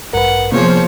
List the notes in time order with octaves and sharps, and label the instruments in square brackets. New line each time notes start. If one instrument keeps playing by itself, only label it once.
[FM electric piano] A1 G2 [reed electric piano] A#4 B4 [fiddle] F#5
[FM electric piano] C3 B3 G#4 [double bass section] F3 [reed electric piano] A#3 [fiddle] C5 C#5